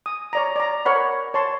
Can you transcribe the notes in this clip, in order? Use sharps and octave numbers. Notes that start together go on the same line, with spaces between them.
D#6
C#5 D5 A#5
D5 A#5
A#4 C#5 F#5 B5
C#5 A5 C6